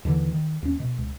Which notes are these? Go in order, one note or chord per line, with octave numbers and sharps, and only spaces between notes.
D#2 D3 E3
D#3
D#2 C#4
B2
C#2